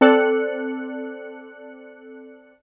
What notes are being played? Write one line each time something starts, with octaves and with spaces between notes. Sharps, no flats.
C4 A4 D5 F#6 C#7